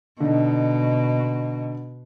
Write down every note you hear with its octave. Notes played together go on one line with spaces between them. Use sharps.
B2 D3 D#4